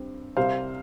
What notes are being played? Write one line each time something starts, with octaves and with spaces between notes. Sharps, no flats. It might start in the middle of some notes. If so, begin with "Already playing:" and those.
Already playing: G2 C4
C2 C3 G3 C5 F5